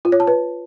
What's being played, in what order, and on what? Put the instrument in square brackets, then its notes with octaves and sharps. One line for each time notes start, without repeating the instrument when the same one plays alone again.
[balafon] F4
C#5
A5
B4